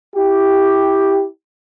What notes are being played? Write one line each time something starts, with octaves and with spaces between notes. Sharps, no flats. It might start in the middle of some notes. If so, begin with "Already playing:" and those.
E4 G4